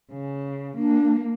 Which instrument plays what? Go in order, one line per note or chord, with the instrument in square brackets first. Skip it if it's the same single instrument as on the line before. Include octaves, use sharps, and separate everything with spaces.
[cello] C#3
[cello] A#3 [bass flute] D4